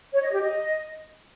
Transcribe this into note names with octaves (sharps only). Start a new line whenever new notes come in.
C#5
D#5
G4
D#5